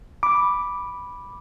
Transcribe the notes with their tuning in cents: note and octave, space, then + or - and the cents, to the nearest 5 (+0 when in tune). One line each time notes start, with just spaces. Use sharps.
B5 -5 D6 +0